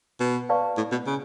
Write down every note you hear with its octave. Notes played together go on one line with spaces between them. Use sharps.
B2
B4 D5 F5 A5 C#6
A2
B2
C#3